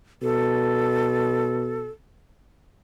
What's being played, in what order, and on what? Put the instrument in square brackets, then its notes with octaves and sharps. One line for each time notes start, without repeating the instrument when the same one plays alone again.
[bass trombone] B2 [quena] A4